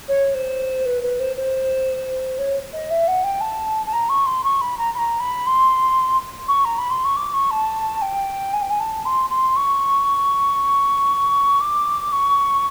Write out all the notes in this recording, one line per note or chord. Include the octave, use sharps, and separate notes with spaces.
C#5
C5
B4
B4
C5
C5
C#5
D#5
E5
F#5
G5
A5
A5
A#5
C#6
C6
C#6
B5
A#5
B5
A#5
B5
C6
C#6
A#5
B5
C6
C#6
D6
C#6
A5
G5
G#5
G5
G#5
A5
C6
C6
C#6
D6
C#6